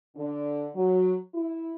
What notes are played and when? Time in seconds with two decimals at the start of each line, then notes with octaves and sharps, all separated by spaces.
0.16 D3
0.75 F#3
1.34 E4